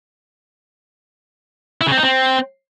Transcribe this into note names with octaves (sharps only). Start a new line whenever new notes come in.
E4
C#3
C4
D#4
C4